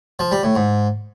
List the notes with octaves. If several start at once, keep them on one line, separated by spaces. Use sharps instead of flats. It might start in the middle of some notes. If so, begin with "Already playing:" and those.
F3
G3
A2
G#2